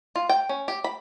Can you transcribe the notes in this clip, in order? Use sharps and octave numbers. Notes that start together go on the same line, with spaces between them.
F4
G5
C#4
G4
B5